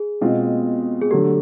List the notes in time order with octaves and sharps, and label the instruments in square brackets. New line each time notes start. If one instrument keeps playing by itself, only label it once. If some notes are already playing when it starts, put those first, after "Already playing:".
Already playing: [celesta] G#4
[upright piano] B2 G#3 C4 F4
[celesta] G#4
[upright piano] D3 F#3 A3 [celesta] G4